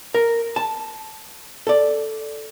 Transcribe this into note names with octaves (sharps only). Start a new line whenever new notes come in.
A#4
A5
A4 D5